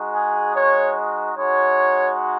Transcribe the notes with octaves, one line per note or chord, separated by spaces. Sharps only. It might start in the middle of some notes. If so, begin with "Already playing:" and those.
Already playing: G#3 D#4 F#4
G#4
C#5
G#3 D#4 F#4 C#5